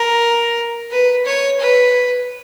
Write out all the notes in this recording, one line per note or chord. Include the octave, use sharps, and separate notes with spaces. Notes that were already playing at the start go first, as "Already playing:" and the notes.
Already playing: A#4
B4
C#5
B4